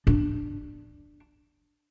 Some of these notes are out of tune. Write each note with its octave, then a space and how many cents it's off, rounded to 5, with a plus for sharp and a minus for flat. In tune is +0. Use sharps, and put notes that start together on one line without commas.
D4 +5